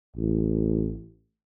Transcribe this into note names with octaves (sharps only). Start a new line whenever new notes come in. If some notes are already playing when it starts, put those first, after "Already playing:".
A1